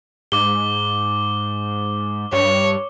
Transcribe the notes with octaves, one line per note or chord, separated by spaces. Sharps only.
G#2 D6 G7
G2 C#5